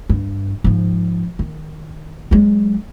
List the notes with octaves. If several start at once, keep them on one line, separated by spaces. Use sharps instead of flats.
G2
G#2 F3
D#3
F#3 G#3